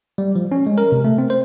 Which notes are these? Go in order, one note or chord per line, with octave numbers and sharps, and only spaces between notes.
G3
F3
C#4
G#3
A#4
C3
A3
C4
C5